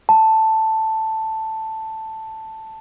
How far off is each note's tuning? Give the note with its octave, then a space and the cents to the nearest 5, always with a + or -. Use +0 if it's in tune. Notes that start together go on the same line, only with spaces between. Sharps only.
A5 +5